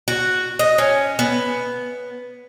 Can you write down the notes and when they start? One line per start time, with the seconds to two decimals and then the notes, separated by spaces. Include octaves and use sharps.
0.08 F#4
0.59 D#5
0.78 C#4
1.19 B3